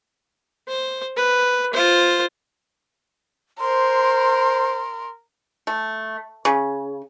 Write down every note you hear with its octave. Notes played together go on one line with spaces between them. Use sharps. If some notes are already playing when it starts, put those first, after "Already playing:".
C5
B4
F4 C5
A#4 C5 C6
A3
C#3